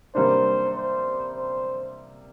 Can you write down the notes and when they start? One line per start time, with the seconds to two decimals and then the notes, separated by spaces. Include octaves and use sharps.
0.15 C3 G3 A#3 D4 C5
0.75 C5
1.35 C5